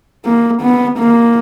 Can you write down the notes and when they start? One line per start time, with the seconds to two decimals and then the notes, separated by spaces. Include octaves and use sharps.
0.25 A#3
0.62 B3
0.99 A#3